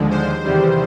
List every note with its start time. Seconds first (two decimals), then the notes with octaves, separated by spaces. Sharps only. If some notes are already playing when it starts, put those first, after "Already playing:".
Already playing: D#2 D3 F3 G#3
0.11 C5
0.44 E2 C3 D#3 G3